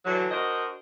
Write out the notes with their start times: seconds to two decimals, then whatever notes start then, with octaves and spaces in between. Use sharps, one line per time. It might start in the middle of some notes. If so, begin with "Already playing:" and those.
0.05 D3 E3 F#3
0.30 D4 F#4 A#4 C5 D#5